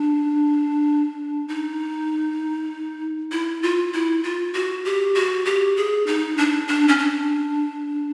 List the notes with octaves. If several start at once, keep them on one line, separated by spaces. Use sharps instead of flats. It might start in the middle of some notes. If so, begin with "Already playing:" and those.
Already playing: D4
D#4
E4
F4
E4
F4
F#4
G4
F#4
G4
G#4
D#4
D4
D4
C#4
D4